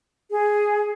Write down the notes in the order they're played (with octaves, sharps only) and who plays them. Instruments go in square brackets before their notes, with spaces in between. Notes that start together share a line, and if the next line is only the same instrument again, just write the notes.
[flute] G#4